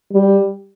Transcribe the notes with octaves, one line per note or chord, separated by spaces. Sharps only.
G3